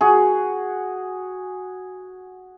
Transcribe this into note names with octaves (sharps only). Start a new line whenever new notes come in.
F#4 G#4